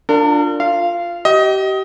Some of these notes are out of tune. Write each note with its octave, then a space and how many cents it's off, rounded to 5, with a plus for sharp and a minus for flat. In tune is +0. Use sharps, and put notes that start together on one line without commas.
D4 +0 F4 +10 A#4 -45
F4 +0 F5 -20
G4 -30 D#5 +20